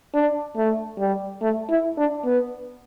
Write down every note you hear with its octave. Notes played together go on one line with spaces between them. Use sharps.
D4
A3
G3
A3
E4
D4
B3